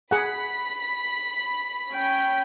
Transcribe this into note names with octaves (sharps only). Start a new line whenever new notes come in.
G#4 F#5 B5 B6
C#4 G5